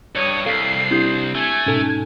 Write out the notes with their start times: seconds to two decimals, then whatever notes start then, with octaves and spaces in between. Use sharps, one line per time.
0.15 G2 C#5 D#6 C#7
0.46 C2 A4 F5 B6 C7
0.91 C4 D4 E4 G4 G6
1.35 A3 G#5 G#6
1.66 G#2 B2 C#4 D#4 A4 A5